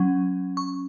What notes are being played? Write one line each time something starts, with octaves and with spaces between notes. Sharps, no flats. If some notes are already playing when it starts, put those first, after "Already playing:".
Already playing: F#3 C#4
C#6